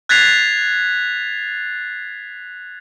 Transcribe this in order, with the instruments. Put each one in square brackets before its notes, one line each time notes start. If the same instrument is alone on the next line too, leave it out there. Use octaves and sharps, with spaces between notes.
[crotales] F#6 G#6 A6 B6 C7 F7